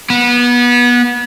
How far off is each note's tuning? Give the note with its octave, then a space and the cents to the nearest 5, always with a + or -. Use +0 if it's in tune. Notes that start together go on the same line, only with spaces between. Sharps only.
B3 -25